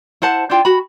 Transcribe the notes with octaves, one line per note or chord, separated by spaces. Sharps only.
E4 C5 F#5 A5
D4 E4 F4 G5
F#4 B5